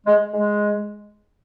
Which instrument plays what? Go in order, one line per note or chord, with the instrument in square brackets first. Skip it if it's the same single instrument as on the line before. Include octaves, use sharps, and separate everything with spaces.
[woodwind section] G#3
G#3